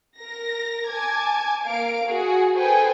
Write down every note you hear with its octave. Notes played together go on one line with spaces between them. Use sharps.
A#4 A#6
G#5 A5 D6 G#6
A#3 A#4 F5 D7
F#4 G#4
G#4 A4 B4 C5 G5 G#5